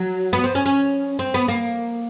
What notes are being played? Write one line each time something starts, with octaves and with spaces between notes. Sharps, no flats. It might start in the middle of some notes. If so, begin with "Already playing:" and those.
Already playing: F#3
B3
C4
C#4
C#4
C4
B3
A#3